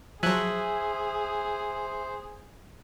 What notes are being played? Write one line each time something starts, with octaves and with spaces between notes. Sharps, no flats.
F3 F#3 G#4 C5 E5 G#5 F#6